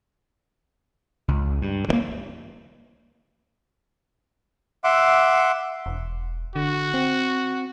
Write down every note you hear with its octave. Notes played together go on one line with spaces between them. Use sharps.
C#2
G2
D3 A#3
E5 F#5 C6 D6
E1
D3 F#4
C4